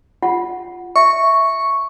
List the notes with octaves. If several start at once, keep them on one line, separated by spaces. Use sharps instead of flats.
F4 F#5
E5 C#6